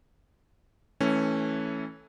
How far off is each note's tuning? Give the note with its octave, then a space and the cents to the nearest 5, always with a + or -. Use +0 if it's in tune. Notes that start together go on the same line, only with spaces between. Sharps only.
E3 -20 A3 +0 C#4 -10